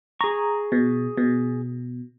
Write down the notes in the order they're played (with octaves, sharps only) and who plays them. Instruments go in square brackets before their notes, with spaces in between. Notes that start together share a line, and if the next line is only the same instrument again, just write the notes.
[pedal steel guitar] G#4 C#6 [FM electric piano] A#5
[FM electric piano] B2
B2